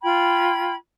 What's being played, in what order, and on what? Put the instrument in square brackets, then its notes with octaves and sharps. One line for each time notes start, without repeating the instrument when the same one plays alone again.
[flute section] F4 G5 B5 G#6